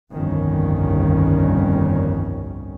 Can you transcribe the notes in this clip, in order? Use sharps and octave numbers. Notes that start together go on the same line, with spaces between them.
G1 C2 F2 D#3 G3 C#4